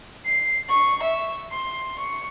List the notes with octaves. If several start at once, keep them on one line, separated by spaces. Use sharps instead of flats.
C7
C#6
E5
C6
C#6